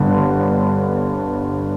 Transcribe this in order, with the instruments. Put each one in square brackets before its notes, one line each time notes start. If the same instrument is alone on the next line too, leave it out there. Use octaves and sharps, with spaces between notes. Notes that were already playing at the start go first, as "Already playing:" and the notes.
Already playing: [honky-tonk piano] G1 G2 D3